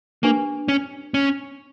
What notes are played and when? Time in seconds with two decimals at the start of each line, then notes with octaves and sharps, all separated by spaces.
0.23 A#3 D4 G4 B4
0.68 C#4
1.14 C#4